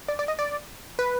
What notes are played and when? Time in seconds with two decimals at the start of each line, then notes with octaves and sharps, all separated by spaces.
0.08 D5
0.19 D5
0.28 D#5
0.39 D5
0.99 B4